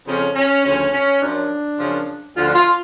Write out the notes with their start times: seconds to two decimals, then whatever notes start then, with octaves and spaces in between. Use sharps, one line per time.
0.07 F2 C#3 F3 C#4
0.35 C#4
0.64 D2 C#3 F3 C#4
0.92 C#4
1.21 F#2 F3 D4
1.79 F#2 C#3 F3
2.35 D2 D3 F3 F4
2.48 D4
2.54 F4